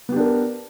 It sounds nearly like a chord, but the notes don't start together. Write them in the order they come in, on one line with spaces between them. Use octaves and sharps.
B3 G4 D4 A#4